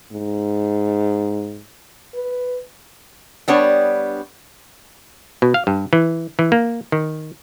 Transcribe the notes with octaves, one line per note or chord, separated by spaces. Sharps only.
G#2
B4
G3 B3 D4 C#5
B2
F5
G2
E3
E3
A#3
D#3